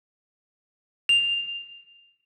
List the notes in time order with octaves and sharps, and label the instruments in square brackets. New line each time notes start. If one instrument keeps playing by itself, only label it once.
[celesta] F7